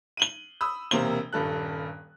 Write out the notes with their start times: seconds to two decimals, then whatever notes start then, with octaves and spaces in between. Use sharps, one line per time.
0.17 D#7 F#7 G7
0.61 B5 D#6 E6
0.91 E1 C3 A#3 C5 G7
1.33 D#1 G2 A4 F#6